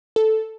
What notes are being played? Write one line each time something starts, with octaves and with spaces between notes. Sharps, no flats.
A4